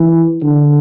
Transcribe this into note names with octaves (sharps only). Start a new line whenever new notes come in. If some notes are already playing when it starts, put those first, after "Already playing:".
Already playing: E3
D3